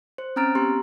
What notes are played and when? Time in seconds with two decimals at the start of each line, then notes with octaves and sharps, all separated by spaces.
0.18 C5
0.36 C4 C#4 A#5 F6 A6 D7
0.55 B3 G4 A#5 C6